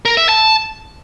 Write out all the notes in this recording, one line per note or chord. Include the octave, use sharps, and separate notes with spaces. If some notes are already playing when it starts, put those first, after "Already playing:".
A#4
E5
A5